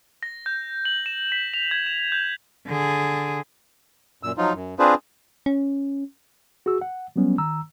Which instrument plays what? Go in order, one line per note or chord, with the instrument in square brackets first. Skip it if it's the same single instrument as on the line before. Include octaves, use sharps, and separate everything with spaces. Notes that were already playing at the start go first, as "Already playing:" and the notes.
[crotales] A#6
G6
F#7
E7
B6
F7
G#6
E7
G6
[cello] D3 G#4
[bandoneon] F#2 A#2 E6
F3 F#3 D#4 F4
F#2
C4 D4 F4 G#4 B4 C5
[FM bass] C#4
[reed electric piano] F#4 G#4 E6
F#5
F#3 G3 B3 C#4
D#3 A#5 E6